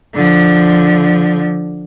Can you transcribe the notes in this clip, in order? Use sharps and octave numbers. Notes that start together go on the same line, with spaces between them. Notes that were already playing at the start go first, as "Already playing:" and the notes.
D3 F3